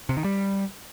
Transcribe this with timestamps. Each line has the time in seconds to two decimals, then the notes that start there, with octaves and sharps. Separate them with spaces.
0.09 C3
0.17 D#3
0.24 G3